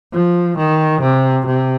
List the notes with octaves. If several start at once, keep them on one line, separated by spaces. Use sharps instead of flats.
F3
D#3
C3
C3